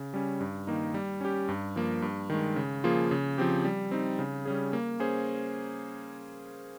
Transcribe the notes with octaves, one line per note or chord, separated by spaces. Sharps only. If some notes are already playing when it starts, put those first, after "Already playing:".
Already playing: C#3
G3 C#4
G2
D#3 A#3 D#4
G3
C#4 G4
G2
F3 A#3
G2
D#3 G#3
C#3
F3 A#3 F4 G#4
C#3
F3 C4 G4
G3
C4 D#4
C#3
G3 C#4 G#4
A#3
C#4 G#4 C5